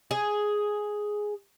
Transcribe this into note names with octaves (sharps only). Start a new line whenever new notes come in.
G#4